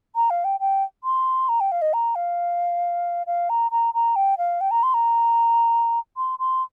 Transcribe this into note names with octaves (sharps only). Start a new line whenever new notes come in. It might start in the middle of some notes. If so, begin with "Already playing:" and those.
A#5
F5
G5
G5
C6
A#5
G5
F5
D#5
A#5
F5
F5
A#5
A#5
A#5
G5
F5
G5
A#5
C6
A#5
C6
C6